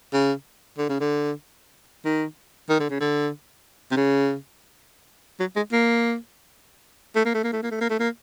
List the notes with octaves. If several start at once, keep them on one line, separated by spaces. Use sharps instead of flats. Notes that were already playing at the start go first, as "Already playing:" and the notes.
C#3
D3
C#3
D3
D#3
D#3
D3
C#3
D3
C3
C#3
F#3
G#3
A#3
A3
A#3
A3
A#3
A3
A#3
A3
A#3
A3
A#3